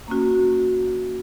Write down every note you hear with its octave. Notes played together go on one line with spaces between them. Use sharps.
A#3 C#4 F#4